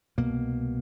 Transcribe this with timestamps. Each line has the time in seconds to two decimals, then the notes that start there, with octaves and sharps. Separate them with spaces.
0.18 C2 B2 A#3